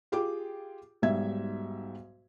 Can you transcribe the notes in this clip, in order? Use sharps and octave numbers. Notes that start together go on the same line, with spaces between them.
F4 G4 G#4 G5 D6
B1 G#2 G3 E5 G#6